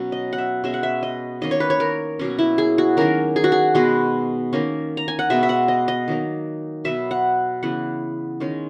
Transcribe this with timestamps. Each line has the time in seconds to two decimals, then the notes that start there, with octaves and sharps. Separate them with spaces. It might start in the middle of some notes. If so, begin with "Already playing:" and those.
Already playing: B2 F#3 C#4
0.12 D#5
0.33 F#5
0.38 E5
0.64 B2 G#3 C#4 E5
0.74 F#5
0.83 E5
1.03 D#5
1.41 D#3 A#3 C#4 D#5
1.51 C#5
1.60 B4
1.70 C#5
1.80 A#4
2.19 B2 F#3 A#3 C#4
2.39 E4
2.58 G#4
2.78 F#4
2.97 D#3 F#3 A#3 C#4 A#4
3.36 G#4
3.44 F#4
3.52 G#4
3.75 B2 G#3 B3 F#4
4.53 D#3 A#3 C#4
4.97 A#5
5.08 G#5
5.19 F#5
5.30 B2 G#3 B3 E5
5.43 E5
5.49 F#5
5.68 D#5
5.88 D#5
6.08 D#3 F#3 A#3
6.85 B2 F#3 B3 E5
7.11 F#5
7.63 C#3 E3 B3 F#5
8.40 D#3 G#3 C#4